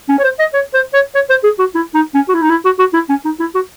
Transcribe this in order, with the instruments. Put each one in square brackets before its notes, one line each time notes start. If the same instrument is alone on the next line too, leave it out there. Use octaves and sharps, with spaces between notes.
[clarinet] C#4
C#5
C5
D#5
C#5
C5
C#5
C#5
C5
G#4
F#4
E4
D#4
C#4
F#4
E4
D#4
E4
F#4
F#4
E4
C#4
D#4
E4
F#4